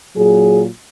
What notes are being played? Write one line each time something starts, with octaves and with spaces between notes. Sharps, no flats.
A#2 F#3 G#4